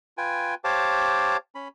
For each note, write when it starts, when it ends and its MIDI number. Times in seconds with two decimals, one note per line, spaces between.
0.18 0.54 65
0.18 0.54 71
0.18 0.54 79
0.18 0.54 80
0.64 1.37 67
0.64 1.37 72
0.64 1.37 73
0.64 1.37 77
0.64 1.37 81
0.64 1.37 86
1.55 1.68 61
1.55 1.68 83